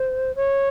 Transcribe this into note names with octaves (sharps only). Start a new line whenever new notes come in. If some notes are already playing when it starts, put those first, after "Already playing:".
Already playing: C5
C#5